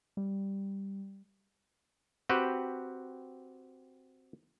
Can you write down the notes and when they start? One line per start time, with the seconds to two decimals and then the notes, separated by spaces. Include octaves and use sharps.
0.17 G3
2.29 C4 F#4 G4 B4